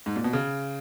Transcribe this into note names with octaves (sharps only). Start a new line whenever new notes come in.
G#2
A#2
B2
C#3